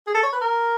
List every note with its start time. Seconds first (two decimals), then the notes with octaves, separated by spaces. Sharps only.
0.07 G#4
0.15 A4
0.23 C#5
0.33 B4
0.41 A#4